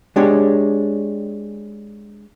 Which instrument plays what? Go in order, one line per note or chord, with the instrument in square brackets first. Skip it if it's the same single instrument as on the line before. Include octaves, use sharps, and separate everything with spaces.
[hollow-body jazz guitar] G#3 D4 G4 C#5